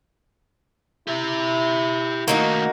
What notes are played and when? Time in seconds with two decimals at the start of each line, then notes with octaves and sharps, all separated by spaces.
1.07 E4 G4 E5
2.28 D#3 A3 A#3 D#4 F#4